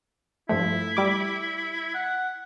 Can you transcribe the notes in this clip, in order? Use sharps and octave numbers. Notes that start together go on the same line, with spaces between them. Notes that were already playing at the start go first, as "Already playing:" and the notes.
G2 F3 A3 E4
G3 D6
F#5